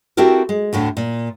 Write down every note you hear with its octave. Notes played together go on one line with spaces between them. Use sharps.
C4 E4 F#4 G4 A4 A#4
G#3
D2 A2 D3 A3
A#2